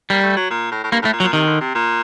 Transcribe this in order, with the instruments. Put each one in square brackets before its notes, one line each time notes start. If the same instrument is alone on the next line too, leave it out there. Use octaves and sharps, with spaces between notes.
[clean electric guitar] G3 [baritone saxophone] A#3
[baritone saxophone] A3
F#3
A#2
A2
A2
[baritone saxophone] G2 [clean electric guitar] A#3
[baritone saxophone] A2 [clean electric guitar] A3
[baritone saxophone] A#2
[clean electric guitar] F#3
[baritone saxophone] A#2
[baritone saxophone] C3 [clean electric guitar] D#3
[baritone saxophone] D3
C3
A#2